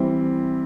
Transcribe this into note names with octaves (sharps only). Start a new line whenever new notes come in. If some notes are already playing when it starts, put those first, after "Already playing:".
Already playing: E3 G3 C4